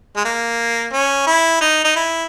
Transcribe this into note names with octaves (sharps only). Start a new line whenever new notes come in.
G#3
A#3
C#4
E4
D#4
D#4
E4